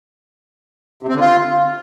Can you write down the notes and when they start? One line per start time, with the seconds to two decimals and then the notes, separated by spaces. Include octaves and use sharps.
1.03 C3
1.09 C4
1.14 D3
1.20 F4